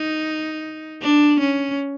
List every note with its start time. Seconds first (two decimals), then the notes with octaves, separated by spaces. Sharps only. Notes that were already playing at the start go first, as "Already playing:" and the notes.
Already playing: D#4
1.02 D4
1.40 C#4